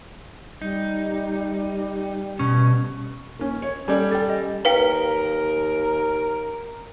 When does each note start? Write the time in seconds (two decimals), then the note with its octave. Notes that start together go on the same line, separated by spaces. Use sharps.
0.62 G3 D#4
2.39 B2 C#4
3.39 A#3 C#4
3.62 C#5
3.88 G3 C#4 G4 A4 D5 G#5
4.11 A4 G5 A6
4.30 D#5
4.65 D#2 A#4 B4 F5 G5